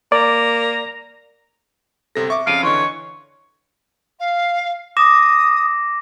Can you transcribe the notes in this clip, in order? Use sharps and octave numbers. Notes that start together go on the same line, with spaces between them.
A#3 D5 A#5
G1 C3 A4 A#6
E5 C#6 D6
F2 C#3 F5 D7 D#7
D3 E3 C#5 D#5 C6
F5
D6 D#6 A#6 E7